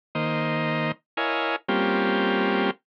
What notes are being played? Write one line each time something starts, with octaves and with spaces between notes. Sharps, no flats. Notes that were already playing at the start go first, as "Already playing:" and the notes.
D#3 A#3 C5 D#5
E4 A#4 C#5 D#5 F5 G#5
G3 A#3 C4 C#4 F4 G4